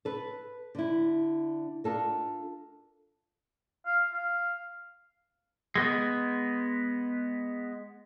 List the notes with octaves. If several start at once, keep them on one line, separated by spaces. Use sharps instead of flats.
A4 B4
D3 E4
D4 F4 A4 A#4
F5
F5
G#3 B3